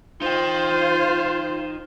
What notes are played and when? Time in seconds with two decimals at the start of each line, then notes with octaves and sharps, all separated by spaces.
0.22 D#4 F4 C5 G5